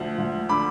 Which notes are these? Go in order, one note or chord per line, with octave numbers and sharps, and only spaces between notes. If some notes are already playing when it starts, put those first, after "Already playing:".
Already playing: D2 F3
D2
D3 B5 D6